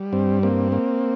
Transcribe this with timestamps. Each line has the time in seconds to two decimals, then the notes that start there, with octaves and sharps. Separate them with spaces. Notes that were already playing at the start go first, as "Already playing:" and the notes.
Already playing: G3
0.13 G2 C4
0.43 A#3 C4
0.72 A#3